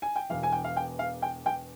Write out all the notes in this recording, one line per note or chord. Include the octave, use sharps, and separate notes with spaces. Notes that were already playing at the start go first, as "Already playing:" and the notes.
G#5
G5
E1 E2 E3 F5
G#5
G5
F5
G5
F5
G5
G5